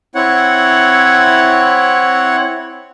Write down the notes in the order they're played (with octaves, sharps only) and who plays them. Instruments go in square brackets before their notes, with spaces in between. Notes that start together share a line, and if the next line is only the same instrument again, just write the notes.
[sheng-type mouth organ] C4 E4 C#5 F#5